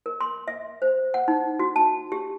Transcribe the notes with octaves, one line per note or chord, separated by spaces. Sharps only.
A#4
C6
E5
C5
F#5
D#4
F#4
A5
G4